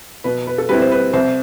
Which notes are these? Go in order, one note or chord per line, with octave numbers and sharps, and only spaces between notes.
B2 B4
B4
A4
G3 C4 E4 B4
C5
B4
C2 C5